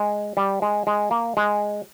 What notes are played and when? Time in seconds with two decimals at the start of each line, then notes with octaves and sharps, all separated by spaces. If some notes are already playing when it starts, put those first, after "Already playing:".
Already playing: G#3
0.37 G3
0.62 G#3
0.87 G#3
1.11 A#3
1.37 G#3